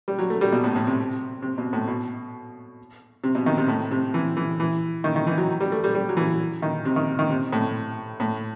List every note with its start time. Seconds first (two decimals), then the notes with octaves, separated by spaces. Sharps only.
0.08 G3
0.19 F#3
0.30 A3
0.41 G3
0.52 B2
0.64 A2
0.76 A2
0.87 C3
1.42 C3
1.58 B2
1.73 A2
1.88 B2
3.24 C3
3.35 B2
3.46 D#3
3.58 C3
3.68 A2
3.91 C3
4.14 E3
4.37 E3
4.60 E3
5.04 D#3
5.16 D#3
5.27 E3
5.38 F#3
5.61 G3
5.72 A3
5.84 G3
5.95 G3
6.09 F#3
6.17 E3
6.62 D#3
6.85 C3
6.96 D#3
7.19 D#3
7.30 C3
7.53 A2
8.20 A2